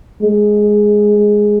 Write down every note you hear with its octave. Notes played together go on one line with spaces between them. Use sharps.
G#3